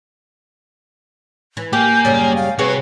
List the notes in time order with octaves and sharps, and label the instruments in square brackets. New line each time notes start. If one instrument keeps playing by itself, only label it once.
[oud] E3
[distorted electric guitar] A#3 [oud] G4 [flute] G#5 [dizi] G6
[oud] F#2 C#3 G3 [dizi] C#5
[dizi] F5
[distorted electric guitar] C3 [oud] F#4 G#4 C#5 [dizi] B4